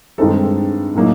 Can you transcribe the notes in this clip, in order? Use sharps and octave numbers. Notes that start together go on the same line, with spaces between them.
G2 D#3 G#3 C4 D#4 A4
A2 F#3 A#3 D#4